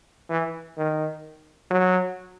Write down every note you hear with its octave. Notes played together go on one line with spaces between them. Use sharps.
E3
D#3
F#3